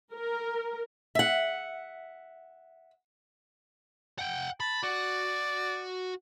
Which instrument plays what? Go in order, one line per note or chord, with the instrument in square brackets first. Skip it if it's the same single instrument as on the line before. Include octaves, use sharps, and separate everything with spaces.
[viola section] A#4
[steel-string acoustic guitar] E5 F#5
[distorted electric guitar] F#5 G5
[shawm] A5 [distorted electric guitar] B5
[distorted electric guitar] F#4 [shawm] D5